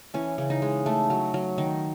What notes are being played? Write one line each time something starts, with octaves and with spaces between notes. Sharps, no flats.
E3 C#4
C#3
D#4
G#3
A3
F#3
F#3
D#3